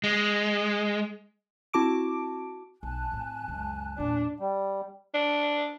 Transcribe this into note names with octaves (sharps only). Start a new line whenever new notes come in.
G#3
C4 E4 F#4 A5 D6 D7
B1 G#5 A5 F#6
A2 C4
C#2 F#2
E2 A#2 D4
G3
D4